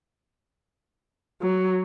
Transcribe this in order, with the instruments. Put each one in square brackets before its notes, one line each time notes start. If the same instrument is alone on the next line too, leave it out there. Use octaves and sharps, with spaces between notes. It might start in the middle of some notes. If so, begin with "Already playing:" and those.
[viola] F#3